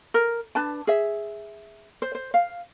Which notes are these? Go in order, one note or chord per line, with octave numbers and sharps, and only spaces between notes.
A#4
D4 B4 A5
G#4 E5
C5
C5
F5